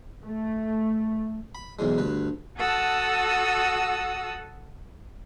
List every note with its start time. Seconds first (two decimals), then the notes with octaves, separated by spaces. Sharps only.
0.24 A3
1.55 B5
1.79 B1 E2 G#2 G#3
1.98 D2 G2 B4
2.57 F#4 A4 F#5 A5 D#6 E6